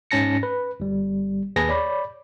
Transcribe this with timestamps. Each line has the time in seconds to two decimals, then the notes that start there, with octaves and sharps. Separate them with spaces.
0.11 G#2 C#4 A5 A#6 C#7
0.43 B4
0.80 G1 G3
1.56 D#2 G#4 B4 G#5 A5 A#6
1.69 C#5 D5 B5